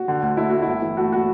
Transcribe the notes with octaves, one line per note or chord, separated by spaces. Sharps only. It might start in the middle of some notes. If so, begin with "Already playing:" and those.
Already playing: F#4
D3
D2
A3 E4
A3 F#4
E4
G1
E3
A3 F#4
F#4